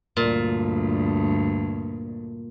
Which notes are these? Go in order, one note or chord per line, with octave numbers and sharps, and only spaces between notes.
D2 G2 A#2